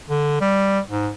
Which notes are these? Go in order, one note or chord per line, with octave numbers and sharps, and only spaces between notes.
D3
G3
G#2